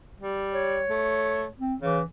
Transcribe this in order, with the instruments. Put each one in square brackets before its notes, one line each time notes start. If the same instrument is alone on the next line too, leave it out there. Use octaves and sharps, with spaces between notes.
[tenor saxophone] G3
[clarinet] C#5
[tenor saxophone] A3
[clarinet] C4
[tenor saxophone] C#3 [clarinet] E3